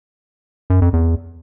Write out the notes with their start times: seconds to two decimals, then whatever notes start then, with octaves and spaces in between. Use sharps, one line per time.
0.70 F#2
0.82 F2
0.93 E2